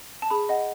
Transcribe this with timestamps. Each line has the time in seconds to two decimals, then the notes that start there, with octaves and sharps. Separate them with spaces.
0.22 A5
0.30 G#4 B5
0.49 D#5 F#5